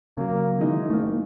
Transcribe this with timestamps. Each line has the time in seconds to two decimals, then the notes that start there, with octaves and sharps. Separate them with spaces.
0.17 C#3 F#3 A#3
0.58 D#3 E3 G#3 D#4
0.90 F#1 A3 A#3